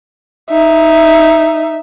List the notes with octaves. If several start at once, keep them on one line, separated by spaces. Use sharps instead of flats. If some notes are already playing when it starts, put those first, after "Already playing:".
D#4 E5